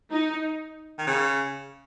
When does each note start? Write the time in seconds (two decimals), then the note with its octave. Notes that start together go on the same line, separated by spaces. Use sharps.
0.12 D#4
0.99 D#3
1.07 C#3